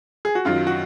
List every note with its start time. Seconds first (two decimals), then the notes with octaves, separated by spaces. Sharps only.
0.25 G#4
0.35 F#4
0.45 F#2 D#3 F#3 F4
0.67 F#4